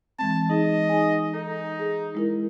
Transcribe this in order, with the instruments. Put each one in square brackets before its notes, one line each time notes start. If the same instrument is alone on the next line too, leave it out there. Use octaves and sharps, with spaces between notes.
[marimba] E3 G#3 C4 [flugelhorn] A5
[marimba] D#4 G#4 [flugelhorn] D#5
[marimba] D#4 G#4 G#5
[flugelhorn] D#4 [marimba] A4
[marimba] G#4
G#3 E4 A#4